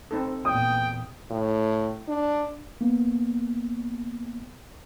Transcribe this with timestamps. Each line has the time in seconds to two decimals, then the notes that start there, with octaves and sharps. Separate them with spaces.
0.11 C4 D#4 A4
0.45 E2 A#2 G5 D#6
1.31 A2
2.08 D4
2.81 A#3 B3